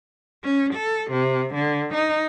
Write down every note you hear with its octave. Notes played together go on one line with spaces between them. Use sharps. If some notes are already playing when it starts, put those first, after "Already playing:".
C#4
A4
C3
D3
D#4